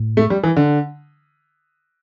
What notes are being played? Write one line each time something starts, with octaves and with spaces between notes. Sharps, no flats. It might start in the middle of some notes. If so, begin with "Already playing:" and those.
Already playing: A2
A3
G3
E3
D3